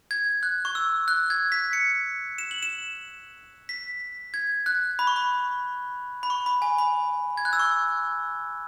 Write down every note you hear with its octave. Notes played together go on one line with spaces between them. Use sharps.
G#6
F#6
C#6
E6
F#6
G#6
B6
C#7
E7
F#7
E7
B6
G#6
F#6
B5
C#6
B5
B5
C#6
B5
G#5
B5
G#6
F#6
E6
C#6